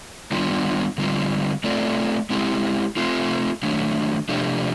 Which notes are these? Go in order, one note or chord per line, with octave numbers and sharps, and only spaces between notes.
D#3 G3 B3 D4 F4
D3 G3 C4 F4
A3 C4 F4 A4 D5
G#3 C4 E4 G4
A3 C4 F4
D#3 F#3 A3 D4
C3 F3 A3 D4 G4